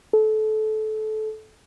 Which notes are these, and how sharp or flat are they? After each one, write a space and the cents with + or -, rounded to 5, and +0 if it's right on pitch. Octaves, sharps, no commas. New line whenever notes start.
A4 -25